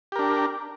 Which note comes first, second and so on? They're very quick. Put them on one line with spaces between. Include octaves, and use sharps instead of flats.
G4 A#4 D4